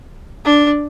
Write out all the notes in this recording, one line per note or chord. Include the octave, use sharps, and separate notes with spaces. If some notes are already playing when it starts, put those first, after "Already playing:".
D4